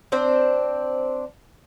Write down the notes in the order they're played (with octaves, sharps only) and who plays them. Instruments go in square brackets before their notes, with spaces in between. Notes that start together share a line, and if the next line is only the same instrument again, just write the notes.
[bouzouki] C4 D4 C5